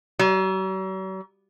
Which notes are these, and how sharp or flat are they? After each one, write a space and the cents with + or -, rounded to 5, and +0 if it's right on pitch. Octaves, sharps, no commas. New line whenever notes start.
F#3 +45